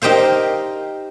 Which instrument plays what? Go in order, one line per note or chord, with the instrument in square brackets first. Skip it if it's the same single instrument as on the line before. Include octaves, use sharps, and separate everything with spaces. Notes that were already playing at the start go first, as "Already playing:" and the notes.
[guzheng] D#4 G4 A#4 C5 F5